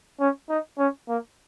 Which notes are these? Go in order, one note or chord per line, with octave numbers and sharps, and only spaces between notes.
C#4
D#4
C#4
A#3